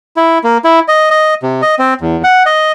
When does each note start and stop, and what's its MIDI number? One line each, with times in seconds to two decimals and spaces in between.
0.17 0.39 64
0.44 0.58 58
0.64 0.80 64
0.88 1.10 75
1.11 1.34 75
1.43 1.62 48
1.62 1.75 75
1.79 1.94 60
2.01 2.22 40
2.24 2.43 78
2.46 2.72 75